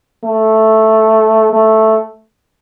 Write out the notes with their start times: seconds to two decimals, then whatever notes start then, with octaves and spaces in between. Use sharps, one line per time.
0.24 A3
1.53 A3